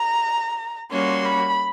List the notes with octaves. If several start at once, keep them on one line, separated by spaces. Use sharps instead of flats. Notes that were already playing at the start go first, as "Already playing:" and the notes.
Already playing: A#5
G3 A#3 C#4 F#4 C6
B5